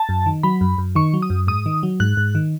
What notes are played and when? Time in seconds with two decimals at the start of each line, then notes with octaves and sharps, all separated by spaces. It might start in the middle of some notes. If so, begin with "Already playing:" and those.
Already playing: A5
0.09 F#2
0.26 D#3
0.43 F#3 B5
0.61 F#2
0.78 F#2
0.95 D#3 C#6
1.13 F#3
1.22 D#6
1.30 F#2
1.47 G#2 D#6
1.66 D#3
1.83 F#3
2.00 G#2 F#6
2.17 G#2
2.35 D#3